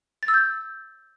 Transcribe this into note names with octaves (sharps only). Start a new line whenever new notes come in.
A6
E6
G6